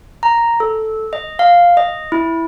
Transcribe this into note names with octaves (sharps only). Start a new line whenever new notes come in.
A#5
A4
D#5
F5
D#5
E4